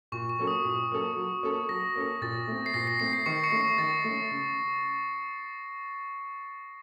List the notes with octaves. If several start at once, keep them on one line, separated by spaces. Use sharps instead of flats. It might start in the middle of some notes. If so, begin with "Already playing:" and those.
A#2 C#6
C#6
F#3 A#3 C#4 A4
D#6
A#2
F#3 A#3 C#4 A4
F#3
A#3 C#4 A4
F#3 A#6
A#3 C#4 A4
A#2 A6
A3 C4
C7
A#2 A#6
C7
A3 C4 C7
C7
D#3 C#6 C#7
C#6 C#7
A3 C#4
C7
D#3 A6
A3 C#4
C#3